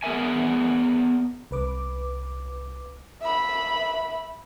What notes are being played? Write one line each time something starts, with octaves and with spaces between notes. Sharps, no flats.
B3 G#4 A#4 E5 G#5
C2 B4 D6
E5 B5